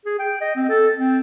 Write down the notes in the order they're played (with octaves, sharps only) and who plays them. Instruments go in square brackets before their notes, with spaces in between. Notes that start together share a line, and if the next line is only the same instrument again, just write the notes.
[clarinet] G#4
G5
D#5
C4
A4
C4